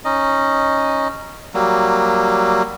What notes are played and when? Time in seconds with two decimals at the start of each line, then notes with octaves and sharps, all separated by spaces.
0.05 C#4 D#4 D#5
1.54 F#3 G3 A#3